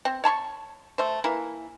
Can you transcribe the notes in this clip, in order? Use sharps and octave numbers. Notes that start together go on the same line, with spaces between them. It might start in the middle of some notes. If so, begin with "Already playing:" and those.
C4
C#5 A5 B5 C#6
A3 C5
E3 A#3 E4